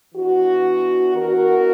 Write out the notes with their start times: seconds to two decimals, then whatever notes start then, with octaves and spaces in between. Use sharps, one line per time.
0.15 E3 B3 D4 F#4
1.15 E3 B3 D4 F#4 A#4